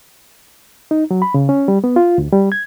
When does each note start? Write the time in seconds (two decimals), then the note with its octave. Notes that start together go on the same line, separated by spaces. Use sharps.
0.91 D#4
1.11 F#3
1.22 B5
1.34 C#3
1.49 C#4
1.68 G3
1.84 B3
1.96 F4
2.18 D2
2.32 G3
2.52 G#6